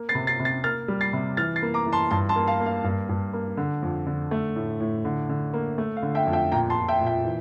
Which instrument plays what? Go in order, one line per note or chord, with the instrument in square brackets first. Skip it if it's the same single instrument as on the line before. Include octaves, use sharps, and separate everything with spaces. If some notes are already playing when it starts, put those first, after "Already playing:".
Already playing: [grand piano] A#3
A6 C7
C3
A6 C7
C3
A6 C7
A#3 F6 A6
G3
A6 C7
C3
E3 F6 A6
A6 C7
A#3
A#5 D6
E3
A5 C6
G2 A5 C6
A5 C6
A#3
F5 A5
A#3
F5
G2
G2
A#3
D3
F2
D3
A3
A2
A2
D3
D3
A#3
A3
F5
D3
E5 G5
F2
E5 G5
A#2 G5 A#5
A5 C6
A#2
E5 G5
A#2
E5 G5
E3